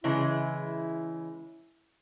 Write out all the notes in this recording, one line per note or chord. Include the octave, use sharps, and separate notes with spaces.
C#3 E3 G#3 E4